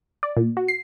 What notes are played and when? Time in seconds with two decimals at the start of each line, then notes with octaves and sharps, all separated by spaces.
0.23 D5
0.37 A#2
0.57 F#4
0.68 C7